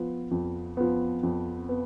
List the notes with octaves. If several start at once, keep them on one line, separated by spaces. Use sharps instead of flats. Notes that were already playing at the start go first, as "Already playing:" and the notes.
Already playing: F3 B3
F2
F3 B3
F2
B3